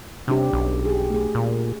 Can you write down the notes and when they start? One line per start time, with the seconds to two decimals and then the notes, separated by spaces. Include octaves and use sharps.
0.28 C3 C#4 D4 G4
0.53 B1
0.85 G4 G#4
1.10 A3 G#4
1.35 A#2